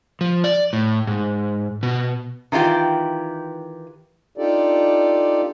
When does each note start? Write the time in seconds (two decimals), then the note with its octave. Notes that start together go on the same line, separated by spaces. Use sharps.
0.21 F3
0.44 D5
0.73 A2
1.07 G#2
1.83 B2
2.52 D#3 E3 F4 G4 G5
4.38 D4 D#4 F4 G4 A4 D5